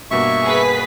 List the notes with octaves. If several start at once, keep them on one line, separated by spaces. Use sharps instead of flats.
G2 B2 A#3 E5 C#6
G#4 B4 B6